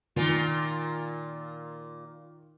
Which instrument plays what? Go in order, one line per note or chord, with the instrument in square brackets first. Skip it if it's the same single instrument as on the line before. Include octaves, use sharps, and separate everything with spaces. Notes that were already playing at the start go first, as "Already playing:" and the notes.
[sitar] A#2 F4 [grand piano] D#3